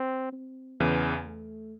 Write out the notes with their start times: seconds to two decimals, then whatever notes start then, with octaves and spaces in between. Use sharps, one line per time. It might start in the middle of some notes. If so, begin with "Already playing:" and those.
Already playing: C4
0.33 C4
0.80 E2 C#3 E3 B3
1.25 A3